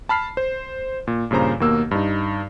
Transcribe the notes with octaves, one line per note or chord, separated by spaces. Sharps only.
A5 B5 F6 C7
C5
A#2
G2 A#2 C#3 C5 A#5
D#2 B2 A#3 E6
G2 D#4